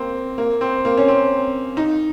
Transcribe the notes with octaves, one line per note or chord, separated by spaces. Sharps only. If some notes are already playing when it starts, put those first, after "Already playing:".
Already playing: A#3 C4
A#3
C4
A#3
C#4
C4
D#4